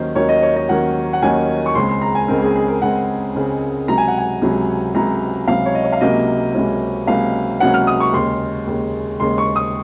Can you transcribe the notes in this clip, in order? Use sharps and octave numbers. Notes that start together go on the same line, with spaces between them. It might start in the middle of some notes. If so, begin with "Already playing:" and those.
Already playing: D#2 D#3 F#3 A#3 C#4 C5
D#2 D#3 F#3 A#3 C#4 C#5
D#5
C#5
D#5
D#2 D#3 F#3 A#3 C#4 F#5
F#5
D#2 D#3 F#3 A#3 C#4 G#5
C#6
C#2 C#3 G#3 C4 C6
C6
A#5
G#5
C#2 C#3 G#3 C4 A#4
G#4
G#4
A#4
C#2 C#3 G#3 C4 F#5
C#2 C#3 G#3 C4
C#2 C3 F#3 A#5
G#5
F#5
G#5
C#2 C3 F#3
C#2 C3 F#3 A#5
C#2 C3 F#3 F5
C#5
D#5
C#5
F5
C#2 C3 F#3 A#3 C#4 D#5
C#2 C3 F#3 A#3 C#4
C#2 C3 F#3 A#3 C#4 F5
C#2 C3 F#3 A#3 C#4 F#5
F6
D#6
C#6
D#2 C#3 G#3 C6
D#2 C#3 G#3
D#2 C#3 G#3 C6
C#6
D#6